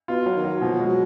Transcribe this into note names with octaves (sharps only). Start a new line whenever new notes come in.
B2 F4
F#3
D#3
F#3
B2 F3
G#3
F#3